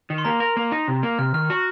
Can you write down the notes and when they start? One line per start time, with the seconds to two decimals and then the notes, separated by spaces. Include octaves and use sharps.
0.10 D#3
0.18 C6
0.25 A#3 A#5
0.40 A#4
0.57 A#3
0.72 D#4
0.88 C3
1.03 A#3
1.18 C3 F6
1.34 D#3 F6
1.50 F#4